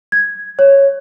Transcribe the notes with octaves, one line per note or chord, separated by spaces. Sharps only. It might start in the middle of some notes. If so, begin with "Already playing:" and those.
G#6
C#5